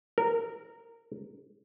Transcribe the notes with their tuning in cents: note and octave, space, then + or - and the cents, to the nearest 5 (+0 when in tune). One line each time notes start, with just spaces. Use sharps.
A#4 -15